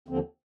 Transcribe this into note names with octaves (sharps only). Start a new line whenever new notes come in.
D#2 D3 F3 C4